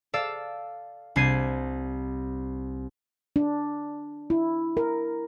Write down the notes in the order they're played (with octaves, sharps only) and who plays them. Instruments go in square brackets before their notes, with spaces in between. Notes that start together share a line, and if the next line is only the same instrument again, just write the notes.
[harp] A4 D5 F5 E6
C2 G3 D4 G#6 C7 D#7
[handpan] D4
E4
A#4